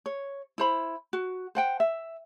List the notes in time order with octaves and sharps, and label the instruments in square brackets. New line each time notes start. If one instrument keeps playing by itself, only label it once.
[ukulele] C#5
E4 C5 B5
F#4
C5 F#5 G5
E5